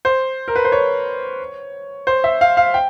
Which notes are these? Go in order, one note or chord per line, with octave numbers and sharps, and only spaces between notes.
C5
A#4
B4
C5
C#5
C5
E5
F5
F5
G5